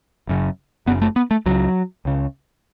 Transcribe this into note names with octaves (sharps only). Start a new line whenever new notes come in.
F#1 F#2 C#3
F#1 F#2 C#3 B3
A3
B3
A3
C#2 C#3 F#3
C#2 C#3